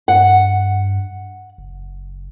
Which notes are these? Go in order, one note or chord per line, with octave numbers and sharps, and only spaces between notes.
G2 F#5
F#1